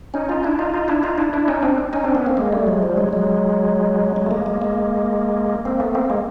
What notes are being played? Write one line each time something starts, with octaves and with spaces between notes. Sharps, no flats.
C#4 D#4
D#4 F4
D4 E4
D#4 F4
D#4 F4
D4 E4
D#4 F4
D4 E4
D4 E4
C#4 D#4
C4 D4
C#4 D#4
C4 D4
B3 C#4
A#3 C4
G#3 A#3
G3 A3
F#3 G#3
F3 G3
F#3 G#3
F#3 G#3
F#3 G#3
A3
G#3 A#3
G#3 A#3
G#3 A#3
A#3 C4
A3 B3
A#3 C4
G#3 A#3